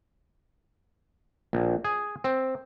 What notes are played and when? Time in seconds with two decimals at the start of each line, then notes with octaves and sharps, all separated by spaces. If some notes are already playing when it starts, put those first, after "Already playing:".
1.53 A#1
1.85 G#4
2.24 C4